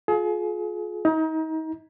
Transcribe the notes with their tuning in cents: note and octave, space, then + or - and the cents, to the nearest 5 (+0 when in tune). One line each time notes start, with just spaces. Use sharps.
F4 +25 G#4 +35
D#4 +35 A#5 +25